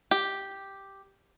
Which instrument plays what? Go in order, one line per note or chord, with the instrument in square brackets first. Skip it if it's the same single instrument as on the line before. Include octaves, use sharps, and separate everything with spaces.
[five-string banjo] G4